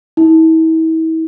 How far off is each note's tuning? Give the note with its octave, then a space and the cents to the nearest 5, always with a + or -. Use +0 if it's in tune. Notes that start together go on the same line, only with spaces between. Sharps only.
E4 -40